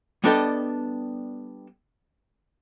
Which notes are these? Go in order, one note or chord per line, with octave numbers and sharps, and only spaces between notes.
G3 B3 D4 A4 D#5 G5